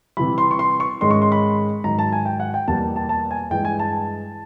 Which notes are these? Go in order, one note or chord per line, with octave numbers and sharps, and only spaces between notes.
C3 E3 G3 B5
C6
C#6
C6
C#6
G#2 D#3 G#3 C#4 C6
C#6
C6
B5
G#2 D#3 F#3 A#5
A5
G#5
G5
F#5
G5
E2 B2 G3 A#3 A5
A5
A5
G#5
G2 E3 G#3 G5
G#5
A5